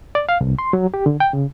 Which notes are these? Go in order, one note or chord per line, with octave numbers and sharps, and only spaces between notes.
D5
F5
C2
C6
F#3
G4
D3
G5
C#3